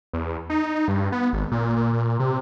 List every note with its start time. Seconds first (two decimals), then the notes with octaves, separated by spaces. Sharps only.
0.13 E2
0.50 D#4
0.88 G2
1.12 B3
1.33 G#1
1.52 A#2
1.76 A#2
1.93 A#2
2.19 C3